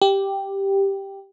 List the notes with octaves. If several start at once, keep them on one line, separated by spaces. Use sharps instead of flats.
G4